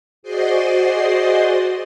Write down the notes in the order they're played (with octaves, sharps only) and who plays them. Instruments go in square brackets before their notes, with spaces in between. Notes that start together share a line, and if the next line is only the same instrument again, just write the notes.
[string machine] F#4 G#4 C5 D5 D#5 C6